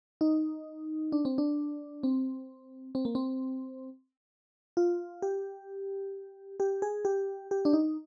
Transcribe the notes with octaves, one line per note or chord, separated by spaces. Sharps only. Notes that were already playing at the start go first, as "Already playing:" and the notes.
D#4
D4
C4
D4
C4
C4
A#3
C4
F4
G4
G4
G#4
G4
G4
D4
D#4